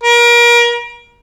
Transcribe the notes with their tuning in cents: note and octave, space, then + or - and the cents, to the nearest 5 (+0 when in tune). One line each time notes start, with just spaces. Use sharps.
A#4 +35